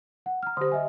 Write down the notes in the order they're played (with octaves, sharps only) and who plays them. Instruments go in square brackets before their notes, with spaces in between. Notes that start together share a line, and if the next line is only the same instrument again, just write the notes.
[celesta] F#5
A#5 F6
[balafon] D3 C5 [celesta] G4 D#6
[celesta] D#5 E5 G#5